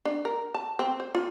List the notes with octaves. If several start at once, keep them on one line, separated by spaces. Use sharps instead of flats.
D4
A#4
A5
C4
C5
F4